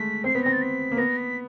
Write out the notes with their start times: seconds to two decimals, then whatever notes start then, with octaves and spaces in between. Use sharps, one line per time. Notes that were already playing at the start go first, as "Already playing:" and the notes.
Already playing: G#3 A3 B6
0.24 C4 C7
0.34 B3 B6
0.43 C4 A#6
0.52 A6
0.61 B6
0.92 A#3
0.97 B3 A#6
1.17 B6